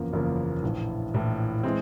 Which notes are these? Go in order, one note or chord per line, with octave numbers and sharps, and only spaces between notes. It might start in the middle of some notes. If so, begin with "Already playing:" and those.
Already playing: F#1 E2 C#3 F3 A#3
F#1 E2 C#3 F3 A#3
A#1 A2 E3
A#1 A2 E3
E3 G#3 C4